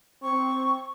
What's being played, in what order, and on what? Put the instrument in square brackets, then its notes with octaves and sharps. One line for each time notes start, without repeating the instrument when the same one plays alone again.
[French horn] C4 [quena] C#6